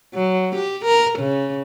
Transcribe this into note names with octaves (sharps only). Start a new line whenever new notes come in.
F#3
G4
A#4
C#3